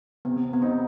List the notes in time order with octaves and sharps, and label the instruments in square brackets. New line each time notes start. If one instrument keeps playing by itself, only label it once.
[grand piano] C3 [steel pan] B3
[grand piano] C3
[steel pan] B3
[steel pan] C4 [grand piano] D#4